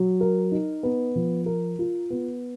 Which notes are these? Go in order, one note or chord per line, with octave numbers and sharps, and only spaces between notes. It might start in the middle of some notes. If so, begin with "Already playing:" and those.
Already playing: F#3
A#4
D#4
B3
F3
A#4
F4
B3